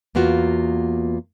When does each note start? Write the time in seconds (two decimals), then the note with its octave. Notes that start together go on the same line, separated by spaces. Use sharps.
0.15 E2 A#3 B3 F4 F#4